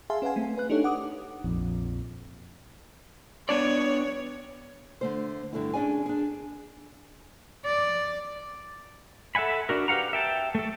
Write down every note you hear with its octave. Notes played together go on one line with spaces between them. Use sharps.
G#4 E5 F5 G#5 A5 C6
C#4 B4 F5 F#5 G#5
A3 C4
B4 F#6
D4 D#4 G4 A4 C#5
F#5 D6 D#6
A#1 F2
B3 D4 C#5 D5
D3 A3 C5
G2 D3 A3 E4
C#4 D4 G#4 D5 G#5
D4 G#4
D5
A4 E5 F#5 G#5 B5
D4 F#4 A#4
G4 B4 F5 F#5 A#5
E5 G5 A5
A3 A4